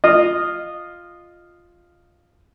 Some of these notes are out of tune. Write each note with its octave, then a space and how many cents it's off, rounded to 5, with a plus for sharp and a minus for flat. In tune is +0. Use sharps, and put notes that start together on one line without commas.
F4 +0 D#5 -15